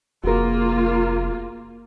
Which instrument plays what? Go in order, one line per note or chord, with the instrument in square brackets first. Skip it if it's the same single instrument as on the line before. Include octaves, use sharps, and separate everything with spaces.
[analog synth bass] F1 [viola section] A#3 F4 [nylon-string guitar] F#4 G#4 A#4